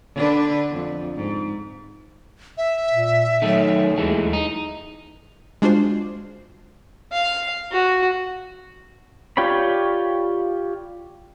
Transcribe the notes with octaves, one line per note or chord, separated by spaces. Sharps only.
D3 D4 B4
F2
G#2
E5
A#2
D#3 F#3 A3
D#2 E3 G#3 A3
D#4
G#3 D4 F4 F#4 C5 C6
F5
F#4
F4 G4 C#5 D5 B5